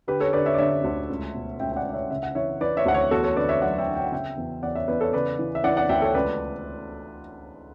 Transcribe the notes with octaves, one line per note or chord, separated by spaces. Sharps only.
D3 G4 B4
A4 C#5
D3 B4 D5
C#5 E5
D5
D3 C#5 E5
D2
C#2
B2
C#2 E5 G5
G5
D5 F#5
C#2
D5
C#5 E5
C#3 E5
F#5
E3 C#5 E5
E3 B4 D5
C#5 E5
D2 F#5
C#5 E5
E2 F#4 A4
A4 C#5
D3 B4 D5
C#5 E5
F#3 D5 F#5
E5 G5
D3
G5
F#5
C#3 E5 G5
E2
E2 D5 F#5
C#5 E5
E2 B4 D5
A4 C#5
C#3 B4 D5
E3
E5
E3 D5 F#5
D5 F#5
D2 E5 G5
A4 C#5
C#2 B4 D5